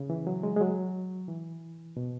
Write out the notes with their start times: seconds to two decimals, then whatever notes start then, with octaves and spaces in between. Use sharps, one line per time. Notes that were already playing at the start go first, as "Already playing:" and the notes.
Already playing: C#3
0.10 E3
0.27 F#3
0.43 G#3
0.56 G#3
0.61 F#3
1.28 E3
1.97 B2